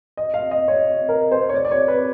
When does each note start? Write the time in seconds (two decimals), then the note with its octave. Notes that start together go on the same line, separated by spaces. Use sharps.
0.17 D#5
0.34 F5
0.51 D#5
0.68 C#5
1.09 A#4
1.32 C5
1.49 C#5
1.54 D5
1.65 D5
1.71 C#5
1.88 B4